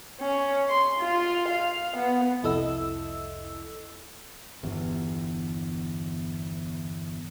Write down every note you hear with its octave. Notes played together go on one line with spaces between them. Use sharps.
C#4
C6
F4
F5
B3
C2 F2 E4 A4 D#5 E6
G1 E2